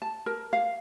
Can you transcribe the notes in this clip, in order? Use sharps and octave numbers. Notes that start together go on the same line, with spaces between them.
A5
A#4
F5